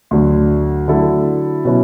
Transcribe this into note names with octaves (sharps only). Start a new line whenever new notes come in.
D2 D3 F#3
D3 F#3 A3 E4 A4
B2 F#3 C#4 E4